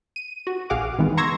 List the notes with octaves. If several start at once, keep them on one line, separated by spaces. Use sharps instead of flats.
D#7
F#4
A#1 G#4 F5 F#5 D6
D#3 E3 G#3 B3
A#5 C6 C#6 E6 G#6 A#6